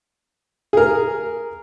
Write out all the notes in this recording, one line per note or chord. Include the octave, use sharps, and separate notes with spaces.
G#4 A#4